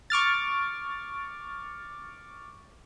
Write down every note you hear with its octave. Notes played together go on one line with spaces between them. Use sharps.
C#6 D6 F6 A6